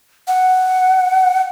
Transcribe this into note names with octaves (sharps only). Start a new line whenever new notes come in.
F#5